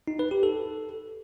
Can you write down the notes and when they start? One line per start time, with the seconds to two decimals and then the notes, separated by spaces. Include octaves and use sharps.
0.08 D#4
0.19 B4
0.31 G4
0.43 A4